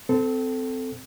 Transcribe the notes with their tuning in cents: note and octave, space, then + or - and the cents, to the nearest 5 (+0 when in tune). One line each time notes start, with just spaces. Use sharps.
C4 -25 A4 +0